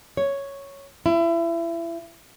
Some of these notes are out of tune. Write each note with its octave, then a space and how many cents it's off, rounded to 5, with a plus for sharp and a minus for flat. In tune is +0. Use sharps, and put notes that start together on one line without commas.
C#5 +0
E4 +30